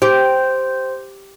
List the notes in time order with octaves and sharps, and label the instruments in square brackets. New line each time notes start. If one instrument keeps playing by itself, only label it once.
[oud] G4 [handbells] C5